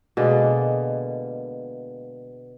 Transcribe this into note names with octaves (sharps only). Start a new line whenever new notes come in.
B2 D3 G#3 A#3